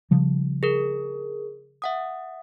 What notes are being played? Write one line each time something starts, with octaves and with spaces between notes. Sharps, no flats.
C#3 F3 G3
G#4 A#4
E5 F#5 D#6